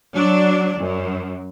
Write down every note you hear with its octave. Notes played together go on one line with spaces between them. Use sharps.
F#3 D4
F#2